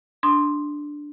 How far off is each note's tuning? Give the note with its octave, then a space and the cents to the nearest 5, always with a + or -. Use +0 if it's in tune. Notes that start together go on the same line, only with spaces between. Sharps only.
D4 +0 C6 +0 D#6 -20